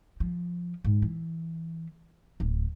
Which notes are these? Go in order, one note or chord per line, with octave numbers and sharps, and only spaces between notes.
F3
G#2
E3
D1